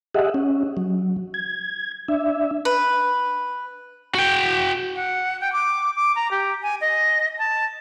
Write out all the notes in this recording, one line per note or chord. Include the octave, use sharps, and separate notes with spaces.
G4 G#4 D#5 E5 F#5
C#4
F#3
G#6
D4 E5
B4
F#4 G5
F#5
G5
D6
D6
A#5
G4
G#5
D#5
A5